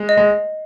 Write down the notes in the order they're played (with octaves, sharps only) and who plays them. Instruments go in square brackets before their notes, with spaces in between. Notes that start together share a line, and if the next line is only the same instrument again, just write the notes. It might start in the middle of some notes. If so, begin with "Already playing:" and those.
Already playing: [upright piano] G#3
[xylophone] D#5
[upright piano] G#3